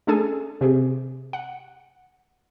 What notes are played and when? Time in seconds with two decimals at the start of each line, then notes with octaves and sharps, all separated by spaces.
0.07 A3 C#4 D4 G#4 A4 G#5
0.61 C3 G4 G#4
1.33 F#5